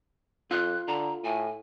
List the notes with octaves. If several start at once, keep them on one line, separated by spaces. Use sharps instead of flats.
F2 F4 F#6
D3 A#5
A2 G#5